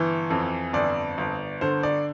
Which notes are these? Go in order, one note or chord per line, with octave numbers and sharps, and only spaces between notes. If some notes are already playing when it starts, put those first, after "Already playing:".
Already playing: G1 E3
F2
G1 D5
G1
D3 C5
D5